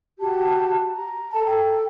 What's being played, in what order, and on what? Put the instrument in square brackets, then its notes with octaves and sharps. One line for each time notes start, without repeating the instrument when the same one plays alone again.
[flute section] F#4 G4 A5
A#5
A4 A5 A#5
A4 G5